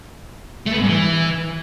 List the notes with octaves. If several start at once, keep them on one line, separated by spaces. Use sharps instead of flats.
A3
B3
G#2
G2
E3